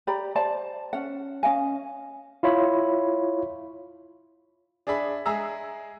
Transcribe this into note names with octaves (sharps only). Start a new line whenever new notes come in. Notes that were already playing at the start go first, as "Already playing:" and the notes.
G4 D5 A#5 B5
C5 D5 A5
C#4 F#5
C#4 D#5 F5 G#5
E4 F4 C#5 B5
D4 G#4 D5 E5 B5
G#3 G#4 E5 A#5 E6